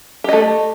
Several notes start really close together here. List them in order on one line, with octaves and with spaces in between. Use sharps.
G4 D#5 A3